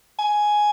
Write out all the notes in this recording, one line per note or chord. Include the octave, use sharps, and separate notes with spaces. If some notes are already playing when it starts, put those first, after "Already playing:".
G#5